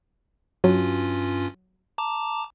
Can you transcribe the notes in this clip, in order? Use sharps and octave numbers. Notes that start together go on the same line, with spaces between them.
G2 F#3 C#4 F4
A5 A#5 D6